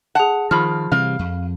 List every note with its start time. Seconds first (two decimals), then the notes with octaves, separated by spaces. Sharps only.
0.15 G#4 F#5 A5
0.51 D#3 F3 F4 B5 F6
0.92 C3 E3 G3 F5
1.19 F2